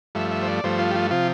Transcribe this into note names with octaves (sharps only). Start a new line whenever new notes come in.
G2 F3 A3 E5
E5
C5
D5
G2 F3 A3 C5
F4
G4
F4
C3 F3 F4